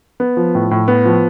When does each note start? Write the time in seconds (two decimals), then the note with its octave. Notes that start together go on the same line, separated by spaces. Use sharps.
0.20 B3
0.37 F3
0.55 A2
0.71 A2
0.88 B3
1.05 F3